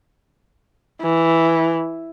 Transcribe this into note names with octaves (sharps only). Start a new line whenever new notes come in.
E3